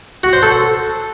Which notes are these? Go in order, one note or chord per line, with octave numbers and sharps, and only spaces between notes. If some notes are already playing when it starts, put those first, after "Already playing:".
F#4
C5
A4